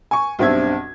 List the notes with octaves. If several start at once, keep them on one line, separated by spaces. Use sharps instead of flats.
G#5 C#6
B1 G2 C4 D4 E5 G#6